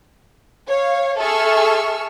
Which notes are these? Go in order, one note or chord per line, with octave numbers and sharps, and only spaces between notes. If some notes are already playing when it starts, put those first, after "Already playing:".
C#5 F5
G#4 A4 E5 C#6 E6 F6